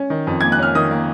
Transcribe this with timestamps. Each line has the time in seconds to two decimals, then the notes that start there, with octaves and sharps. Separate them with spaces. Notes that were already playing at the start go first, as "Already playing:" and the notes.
Already playing: C#4
0.10 D#3
0.27 F2
0.41 A#3 G#6
0.52 F#6
0.59 C#4 F6
0.75 D#3 D#6
0.91 A#3